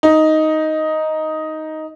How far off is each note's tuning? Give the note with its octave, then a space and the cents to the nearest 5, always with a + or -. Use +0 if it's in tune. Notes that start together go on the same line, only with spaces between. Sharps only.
D#4 +5